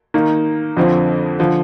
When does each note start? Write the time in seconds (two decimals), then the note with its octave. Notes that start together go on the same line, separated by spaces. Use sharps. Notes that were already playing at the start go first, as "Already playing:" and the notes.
0.14 D#3 A#3 D#4
0.77 F2 D3 F3 C4
1.39 D3 F3